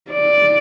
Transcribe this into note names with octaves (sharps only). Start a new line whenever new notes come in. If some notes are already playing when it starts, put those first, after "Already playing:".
D5